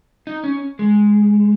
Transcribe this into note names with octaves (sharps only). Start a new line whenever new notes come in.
D#4
C#4
G#3